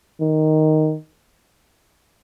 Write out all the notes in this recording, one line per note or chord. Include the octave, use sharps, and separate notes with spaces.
D#3